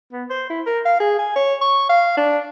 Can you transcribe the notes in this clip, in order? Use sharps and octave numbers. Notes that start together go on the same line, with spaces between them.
B3
C5
E4
A#4
F5
G#4
G#5
C#5
C#6
F5
D4